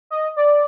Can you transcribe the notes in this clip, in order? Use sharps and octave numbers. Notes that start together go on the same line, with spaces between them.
D#5
D5